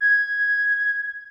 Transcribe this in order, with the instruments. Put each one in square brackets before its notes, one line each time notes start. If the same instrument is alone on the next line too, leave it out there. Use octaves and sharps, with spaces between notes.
[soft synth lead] G#6